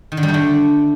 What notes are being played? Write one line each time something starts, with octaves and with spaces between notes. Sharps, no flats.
D#3
D3
G3
A3
D3